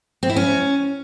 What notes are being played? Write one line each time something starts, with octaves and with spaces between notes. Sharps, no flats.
C4
E4
C#4